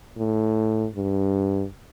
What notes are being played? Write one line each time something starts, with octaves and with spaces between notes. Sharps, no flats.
A2
G2